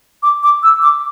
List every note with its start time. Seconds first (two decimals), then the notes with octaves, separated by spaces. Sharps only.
0.23 D6
0.43 D6
0.63 E6
0.82 D6